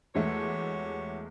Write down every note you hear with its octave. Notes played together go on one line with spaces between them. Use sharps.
E2 G#3 A3 F#4 G4 C#5